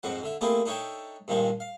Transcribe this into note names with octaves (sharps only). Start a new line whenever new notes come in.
F2 G#2 F3 F#5
D3 E5
A3 A#3 C4 E4 G4 G#4
D4 D#4 A4 C#5 E5 G5
G2 A#2 D#3 F3 G#3
F5